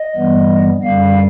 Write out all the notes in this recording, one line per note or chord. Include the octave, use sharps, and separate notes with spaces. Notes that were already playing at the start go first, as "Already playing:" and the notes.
Already playing: D#5
G2 E3 G3 B3
F#2 D3 G3 F5